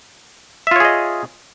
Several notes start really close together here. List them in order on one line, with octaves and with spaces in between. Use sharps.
E5 F4 C#5 G#4 D#5